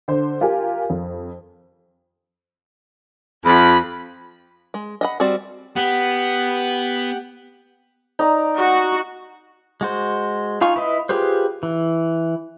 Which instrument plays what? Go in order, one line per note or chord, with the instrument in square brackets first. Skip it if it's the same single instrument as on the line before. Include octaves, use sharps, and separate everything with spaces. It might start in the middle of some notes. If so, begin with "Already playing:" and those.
[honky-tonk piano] D3 C5
F4 G4 A#4 G#5
F2
[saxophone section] F2 [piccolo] B5
[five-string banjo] G#3
D#5 F#5 B5
G3 C4 F#4 C5 D5
[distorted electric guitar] B3 [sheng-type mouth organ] G4 F#5
[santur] D#4 D5 A#5
[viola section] F#4
[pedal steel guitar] G#3 F#4 C5
D#4 F4 F5 G#5 C#6
E4 B4 D#5
F4 G4 G#4 B4 C5
E3